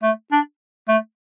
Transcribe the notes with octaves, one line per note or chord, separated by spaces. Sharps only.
A3
D4
A3